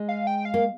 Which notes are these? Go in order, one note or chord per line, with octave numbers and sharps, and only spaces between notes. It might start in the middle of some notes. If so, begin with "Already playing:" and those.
Already playing: G#3
F5
G5
F5
A#3